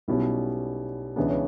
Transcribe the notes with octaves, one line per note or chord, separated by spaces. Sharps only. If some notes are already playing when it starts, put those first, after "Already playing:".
B1 B2 G3 C#4 E4
C#2 C#3 E3 B3 D4
C#5